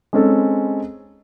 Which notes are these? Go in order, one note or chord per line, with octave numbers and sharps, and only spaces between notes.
G#3 C4 C#4 D#4 A4